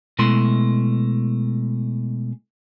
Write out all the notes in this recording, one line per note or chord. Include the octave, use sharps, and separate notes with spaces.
B2 G#3 A3 E4 C6